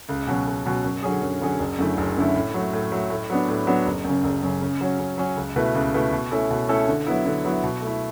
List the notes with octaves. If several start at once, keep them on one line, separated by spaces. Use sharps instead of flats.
C#2
B2 F#3 C#4
C#2
B2 F#3 C#4
F#2
D3 F#3 C#4 G#4
F#2
D3 F#3 C#4 G#4
F#1
F#2 D3 A3 E4
F#1
F#2 D3 A3 E4
A2
F#3 A3
A2
F#3 A3
A2
F#3 B3 D4
A2
F#3 B3 D4
F#1
F#2 C#3
F#1
F#2 C#3
C#3
F#3 C#4
C#3
F#3 C#4
C#2
B2 A3 E4 B4
C#2
B2 A3 E4 B4
B2
A3 C#4 E4 A4
B2
A3 C#4 E4 A4
D3
F#3 B3 E4
D3
F#3 B3 E4
B2
A3 E4